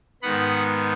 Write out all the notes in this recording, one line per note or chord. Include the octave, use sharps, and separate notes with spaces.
G#2 D#3 B3 F#5 B5